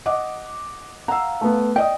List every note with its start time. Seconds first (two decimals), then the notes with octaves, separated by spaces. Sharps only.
0.06 D#5 F#5 D6
1.08 F5 F#5 A#5 E6
1.41 A3 B3
1.76 D5 D#5 G5 D#6